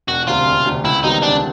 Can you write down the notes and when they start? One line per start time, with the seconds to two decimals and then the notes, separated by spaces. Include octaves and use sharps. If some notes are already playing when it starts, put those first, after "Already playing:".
0.08 E1 F#4
0.27 D2 C3 F4
0.47 E1
0.65 D2 C3
0.84 C#2 E4
1.04 C3 D#3 G3 B3 D#4
1.22 C#2 D4